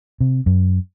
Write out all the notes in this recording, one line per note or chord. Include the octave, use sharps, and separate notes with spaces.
C3
F#2